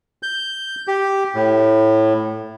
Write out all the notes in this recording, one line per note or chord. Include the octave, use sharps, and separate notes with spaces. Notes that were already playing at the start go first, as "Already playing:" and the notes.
G6
G4
A2